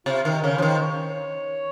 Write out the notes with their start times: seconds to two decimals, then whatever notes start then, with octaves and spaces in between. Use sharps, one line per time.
0.06 C3 F4
0.25 D#3
0.31 A#4
0.44 C#3
0.57 F3 C5
0.62 D#3
0.82 C#5